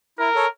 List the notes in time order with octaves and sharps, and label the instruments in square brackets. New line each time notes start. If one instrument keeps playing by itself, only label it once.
[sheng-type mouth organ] E4 [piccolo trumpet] A#4
[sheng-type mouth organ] A4 C#5